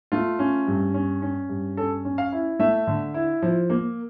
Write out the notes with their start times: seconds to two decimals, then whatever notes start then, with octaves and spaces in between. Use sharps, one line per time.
0.12 A3 F4
0.39 C#4
0.67 G2
0.94 C#4
1.22 C#4
1.49 G2
1.77 C#4 A4
2.05 C#4
2.18 F5
2.32 E4
2.59 A3 E5
2.87 D3
3.14 E4
3.42 F3
3.70 A#3